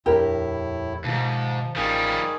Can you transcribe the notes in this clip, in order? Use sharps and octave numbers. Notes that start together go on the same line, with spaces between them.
D#1 F2 A2 D4 E4 G4 A#4
D2 G#2 B2 D#3 F3
A1 D#3 F3 G3 C#4 G#4